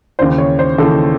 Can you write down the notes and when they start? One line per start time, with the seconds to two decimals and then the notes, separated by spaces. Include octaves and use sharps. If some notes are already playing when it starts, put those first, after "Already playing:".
0.19 D#2 C#3 E3 C5
0.38 C#5
0.59 C5
0.78 D#2 C#3 E3 A4